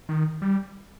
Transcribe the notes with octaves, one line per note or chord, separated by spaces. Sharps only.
D#3
G3